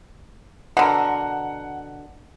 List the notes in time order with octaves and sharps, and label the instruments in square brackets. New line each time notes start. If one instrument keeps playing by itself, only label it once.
[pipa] B2 D3 A#4 [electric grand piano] F#5